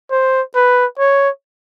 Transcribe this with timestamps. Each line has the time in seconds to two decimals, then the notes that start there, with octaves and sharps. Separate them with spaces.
0.11 C5
0.55 B4
0.99 C#5